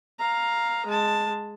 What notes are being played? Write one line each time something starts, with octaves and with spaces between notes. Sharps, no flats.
F5 A#5
G#3 A5